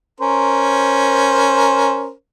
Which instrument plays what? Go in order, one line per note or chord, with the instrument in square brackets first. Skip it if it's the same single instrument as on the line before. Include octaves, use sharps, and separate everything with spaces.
[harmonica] C#4 A#4 C5